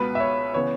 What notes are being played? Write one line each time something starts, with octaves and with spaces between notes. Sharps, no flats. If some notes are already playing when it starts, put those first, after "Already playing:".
Already playing: C#2 B2 B3 B4
E5
C#5
C#3 E3 B3 C#5